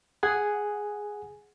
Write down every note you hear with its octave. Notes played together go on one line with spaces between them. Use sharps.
G#4 F#5 G#5